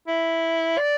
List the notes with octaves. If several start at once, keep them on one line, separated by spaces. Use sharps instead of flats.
E4
D5